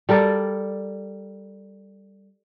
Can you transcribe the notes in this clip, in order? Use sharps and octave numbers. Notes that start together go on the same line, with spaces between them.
G3 A4 A#4 D5